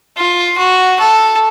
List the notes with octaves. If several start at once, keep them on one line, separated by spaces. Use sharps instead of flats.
F4
F#4
A4